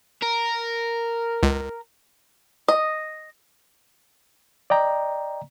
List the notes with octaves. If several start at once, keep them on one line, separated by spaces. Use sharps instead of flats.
A#4
C#2
D#5
D5 D#5 G5 A#5